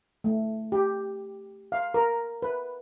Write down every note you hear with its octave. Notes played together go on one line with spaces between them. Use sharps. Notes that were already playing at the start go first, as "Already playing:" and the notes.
A3
G4
F5
A#4
B4